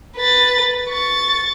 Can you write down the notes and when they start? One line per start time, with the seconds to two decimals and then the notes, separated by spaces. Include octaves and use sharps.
0.17 B4 A6
0.89 C#6 A6